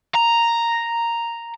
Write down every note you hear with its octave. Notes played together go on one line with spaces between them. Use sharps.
A#5